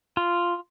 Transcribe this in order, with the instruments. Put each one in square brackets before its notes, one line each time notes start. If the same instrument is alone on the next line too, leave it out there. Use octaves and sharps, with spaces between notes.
[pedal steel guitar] F4